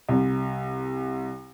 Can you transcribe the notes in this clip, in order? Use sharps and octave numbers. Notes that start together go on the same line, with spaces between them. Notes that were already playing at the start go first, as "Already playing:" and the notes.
C2